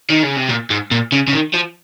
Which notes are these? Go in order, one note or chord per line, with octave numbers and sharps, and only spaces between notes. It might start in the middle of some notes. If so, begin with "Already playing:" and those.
D#3
C#3
C3
A#2
G#2
A#2
C#3
C#3
D#3
F3